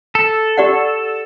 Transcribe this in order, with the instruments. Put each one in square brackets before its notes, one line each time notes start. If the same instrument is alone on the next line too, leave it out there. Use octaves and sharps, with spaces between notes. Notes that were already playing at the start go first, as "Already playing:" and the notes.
[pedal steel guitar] A4
[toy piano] G4 D5 F#5